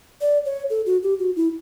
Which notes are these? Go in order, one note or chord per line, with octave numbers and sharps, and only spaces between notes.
D5
C#5
A4
F#4
G4
F#4
E4